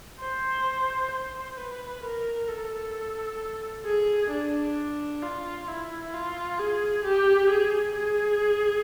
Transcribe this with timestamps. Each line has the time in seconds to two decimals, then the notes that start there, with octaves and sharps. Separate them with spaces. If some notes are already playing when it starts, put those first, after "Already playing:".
0.20 C5
1.11 C5
1.57 B4
2.03 A#4
2.48 A4
3.85 G#4
4.31 D4
5.22 F4
5.68 E4
6.13 F4
6.59 G#4
7.05 G4
7.50 G#4
7.96 G#4